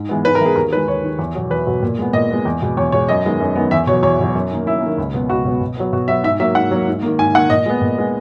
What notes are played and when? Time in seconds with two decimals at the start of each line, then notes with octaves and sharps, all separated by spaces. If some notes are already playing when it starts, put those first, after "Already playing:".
Already playing: G#2
0.09 E3 G#3 B3
0.24 G#2 B4
0.35 A#4
0.40 E3 G#3 B3
0.46 G#4
0.56 D#2 A#4
0.72 D#3 B4
0.76 G#3
0.87 D#2 C#5
1.03 D#3 G#3
1.19 E2
1.35 B2 F#3
1.50 E2 B4
1.67 B2 F#3
1.82 A#2
1.98 G#3 B3
2.13 A#2 D#5
2.30 G#3 B3
2.45 E2
2.62 B2 G#3
2.77 E2 C#5
2.92 B2 G#3 C#5
3.08 F#2 D#5
3.24 D#3 G#3 B3
3.40 F#2
3.56 D#3 G#3 B3
3.71 E2 E5
3.87 B2 C#5
3.92 F#3
4.03 E2 C#5
4.20 B2 F#3
4.35 F#2
4.51 D#3 A#3
4.67 F#2 E4
4.82 D#3 A#3
4.98 C#2
5.13 B2 F#3 B3
5.29 C#2 F#4
5.45 B2 F#3 B3
5.61 B2
5.77 F#3 B3
5.93 B2 F#4
6.08 F#3 B3 E5
6.24 G#2 E5
6.40 F#3 A#3 E5
6.55 G#2 F#5
6.71 F#3 A#3
6.87 G#2
7.03 D#3 A#3
7.19 G#2 G#5
7.35 D#3 A#3 F#5
7.50 A#2 D#5
7.66 G#3 B3
7.81 A#2
7.98 G#3 B3